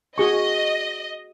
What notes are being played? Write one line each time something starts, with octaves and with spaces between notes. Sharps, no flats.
F#4 G#4 D#5 C#6